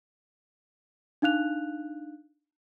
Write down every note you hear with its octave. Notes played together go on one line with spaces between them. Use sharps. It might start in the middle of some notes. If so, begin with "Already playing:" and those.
D4 D#4 F5 F#6 F7